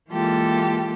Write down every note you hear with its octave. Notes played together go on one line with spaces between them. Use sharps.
E3 G#3 A#3 F4 G4 A4